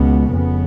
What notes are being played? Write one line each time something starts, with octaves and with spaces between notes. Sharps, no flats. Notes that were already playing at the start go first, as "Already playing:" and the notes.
Already playing: C#2 B2 B3
F1 F2 C#3 B3